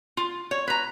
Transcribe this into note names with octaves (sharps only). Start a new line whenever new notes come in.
F4
C#5
B4 A#5